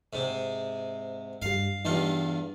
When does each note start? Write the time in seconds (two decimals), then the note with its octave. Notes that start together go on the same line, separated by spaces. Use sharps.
0.13 G#2 C3
1.42 G2 G3 F5
1.85 E2 G2 D#4 F4 G4